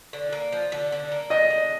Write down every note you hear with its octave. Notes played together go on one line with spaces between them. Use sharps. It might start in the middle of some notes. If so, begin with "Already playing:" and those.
D3
A#3
F3
D3
D3
A#3
F3 D#5
D3